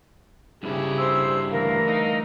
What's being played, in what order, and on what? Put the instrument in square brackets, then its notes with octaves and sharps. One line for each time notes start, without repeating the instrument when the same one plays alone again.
[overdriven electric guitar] G2 E4 [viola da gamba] C#3 G4 G#4
[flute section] C5 C6 E6
[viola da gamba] D3 E3 A3 [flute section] A#4 F5
[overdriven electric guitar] D#4